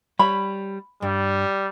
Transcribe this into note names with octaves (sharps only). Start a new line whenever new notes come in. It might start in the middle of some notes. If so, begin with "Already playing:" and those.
G3 C#5 B5
G2 G3